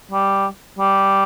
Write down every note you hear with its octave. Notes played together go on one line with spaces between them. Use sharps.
G3
G3